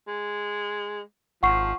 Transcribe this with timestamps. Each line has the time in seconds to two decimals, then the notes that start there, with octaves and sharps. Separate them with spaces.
0.08 G#3
1.43 G#1 F3 F#5 C#6 C7